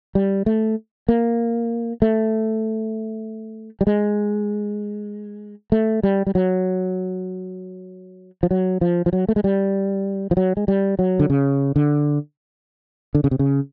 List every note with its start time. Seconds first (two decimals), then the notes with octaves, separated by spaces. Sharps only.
0.15 G3
0.46 A3
1.09 A#3
2.02 A3
3.81 G3
3.87 G#3
5.72 A3
6.03 G3
6.27 G3
6.35 F#3
8.43 F3
8.51 F#3
8.81 F3
9.06 F3
9.13 F#3
9.29 A3
9.36 G#3
9.44 G3
10.31 F3
10.37 F#3
10.57 G#3
10.68 G3
10.99 F#3
11.20 D3
11.30 C#3
11.76 D3
13.15 D3
13.24 C#3
13.31 C3
13.39 C#3